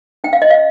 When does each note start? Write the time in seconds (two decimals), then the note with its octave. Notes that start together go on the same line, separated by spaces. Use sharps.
0.24 C#4 G5
0.33 F5
0.42 D#5
0.50 F5